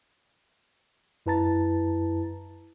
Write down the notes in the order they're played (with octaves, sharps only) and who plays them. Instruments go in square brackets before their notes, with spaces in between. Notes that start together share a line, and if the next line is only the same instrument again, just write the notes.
[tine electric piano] F#2 E4 B4 A5 A#5 A6